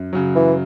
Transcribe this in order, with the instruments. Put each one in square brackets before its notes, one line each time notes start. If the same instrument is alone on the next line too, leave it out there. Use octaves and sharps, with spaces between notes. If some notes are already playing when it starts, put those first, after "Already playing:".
Already playing: [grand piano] F#2
C#3 F#3
[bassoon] E3